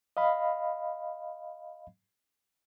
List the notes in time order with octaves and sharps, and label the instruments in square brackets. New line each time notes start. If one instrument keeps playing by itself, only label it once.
[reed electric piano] D#5 F5 B5